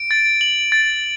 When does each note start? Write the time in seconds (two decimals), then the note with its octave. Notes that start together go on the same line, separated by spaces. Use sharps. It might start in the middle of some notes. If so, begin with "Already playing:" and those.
Already playing: D7
0.11 A6
0.41 F#7
0.72 A6